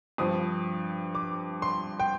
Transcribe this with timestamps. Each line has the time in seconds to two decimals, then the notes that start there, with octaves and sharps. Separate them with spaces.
0.18 G2 F3 C4 D#6
1.15 D6
1.62 C6
2.00 G5